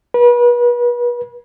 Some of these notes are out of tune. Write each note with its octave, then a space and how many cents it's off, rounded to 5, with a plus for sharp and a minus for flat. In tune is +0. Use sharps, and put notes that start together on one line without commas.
B4 -35